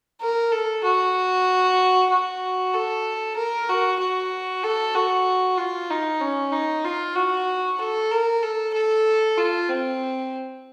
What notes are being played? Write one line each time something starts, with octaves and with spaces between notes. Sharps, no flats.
A#4
A4
F#4
F#4
A4
A#4
F#4
F#4
A4
F#4
F4
D#4
C#4
D#4
F4
F#4
A4
A#4
A4
A4
F4
C4